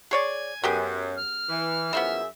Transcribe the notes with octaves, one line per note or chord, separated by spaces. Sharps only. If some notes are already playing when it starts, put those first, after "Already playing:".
G#4 C#5 D5 G#5
F#2 B3 G4 G#4
F6
E3
F#2 E3 F3 B3 G#4 E5